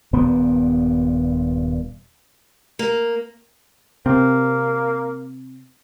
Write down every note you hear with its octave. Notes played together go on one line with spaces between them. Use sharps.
D#1 G2 A#2 B3
A#3
C3 A#3 C4